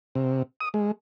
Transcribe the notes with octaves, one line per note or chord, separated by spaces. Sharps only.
C3
D#6
G#3